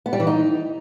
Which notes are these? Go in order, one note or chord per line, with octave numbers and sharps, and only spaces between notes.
B3
G3
E3
D#4